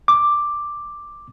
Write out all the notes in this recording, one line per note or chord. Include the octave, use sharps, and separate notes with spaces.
D6